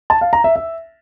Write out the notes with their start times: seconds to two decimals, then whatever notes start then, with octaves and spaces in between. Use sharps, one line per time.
0.10 A5
0.21 F5
0.33 A#5
0.44 E5
0.56 E5